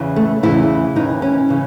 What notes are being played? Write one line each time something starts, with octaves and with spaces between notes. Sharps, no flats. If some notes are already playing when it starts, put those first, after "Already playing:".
Already playing: E2 C#3 E3
A3
E2 C#3 E3 E4
D#2 C#3 E3 D#4
C#4
C#3 E3